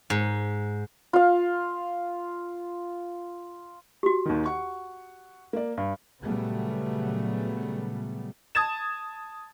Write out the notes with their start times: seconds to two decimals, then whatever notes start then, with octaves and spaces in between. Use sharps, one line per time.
0.10 G#2
1.13 F4 F5
4.03 F#4 G4
4.26 D#2 D#3
4.46 F#5 C#6
5.53 A#3 D5
5.77 G2
6.22 A#2 C#3 F#3 G3 A3 B3
8.55 A5 D#6 G#6 A6 E7